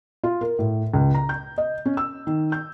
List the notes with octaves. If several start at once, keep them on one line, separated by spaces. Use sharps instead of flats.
F4
A#4
A2
C#2
A#5
G6
D#5
C#4
E6
D#3
G6